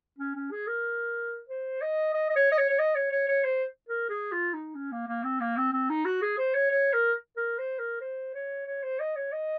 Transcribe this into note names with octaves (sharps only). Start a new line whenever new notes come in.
C#4
C#4
G#4
A#4
C5
D#5
D#5
D#5
C#5
D#5
C#5
C#5
D#5
C#5
C#5
C#5
C5
A#4
G#4
F4
D#4
C#4
A#3
A#3
C4
A#3
C4
C4
D#4
F#4
G#4
C5
C#5
C#5
A#4
A#4
C5
A#4
C5
C#5
C#5
C5
D#5
C#5
D#5